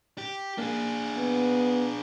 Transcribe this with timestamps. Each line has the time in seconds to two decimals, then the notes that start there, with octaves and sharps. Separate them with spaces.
0.18 G4
0.58 A#3 D4 G#4
1.17 B3